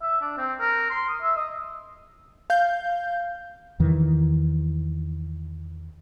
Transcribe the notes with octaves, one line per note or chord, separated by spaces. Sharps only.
E5
D4
C4
A#4
C6
D#6
E5
D#5
F5 G6
E2 D#3 E3